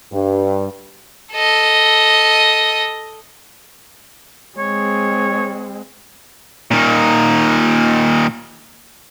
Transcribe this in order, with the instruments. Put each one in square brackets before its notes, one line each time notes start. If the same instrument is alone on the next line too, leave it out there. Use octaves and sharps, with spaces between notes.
[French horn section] G2
[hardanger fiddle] A4 D#5
[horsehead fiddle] G#3 C4 [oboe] C#5
[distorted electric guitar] A#2 D#3